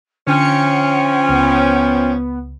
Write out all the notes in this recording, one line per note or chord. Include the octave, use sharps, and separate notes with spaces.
D3 F3 C#4 G5 C#7
C#2 B3